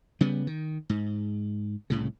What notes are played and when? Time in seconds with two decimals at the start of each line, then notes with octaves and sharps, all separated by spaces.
0.21 C#3 G3 B3
0.47 D#3
0.89 G#2
1.90 C2 A2 C#3